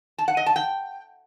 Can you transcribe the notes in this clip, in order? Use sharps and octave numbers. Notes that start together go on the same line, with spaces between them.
A5
F#5
D#5
A5
G5